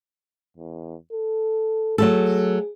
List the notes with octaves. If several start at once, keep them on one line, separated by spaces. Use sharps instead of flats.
E2
A4
F#3 A3 G#4 A4